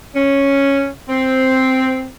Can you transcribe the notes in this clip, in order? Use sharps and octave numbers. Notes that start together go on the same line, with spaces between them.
C#4
C4